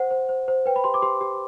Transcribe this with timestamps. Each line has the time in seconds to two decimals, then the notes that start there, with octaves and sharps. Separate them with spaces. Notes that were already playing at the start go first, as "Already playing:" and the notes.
Already playing: C5 F#5
0.11 C5
0.29 C5
0.48 C5
0.66 B4 G5
0.76 B5
0.84 G4 C6
0.94 D6
1.02 G4 C6
1.21 G4